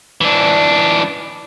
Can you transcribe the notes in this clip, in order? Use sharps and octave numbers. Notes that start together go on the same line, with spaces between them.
E3 D4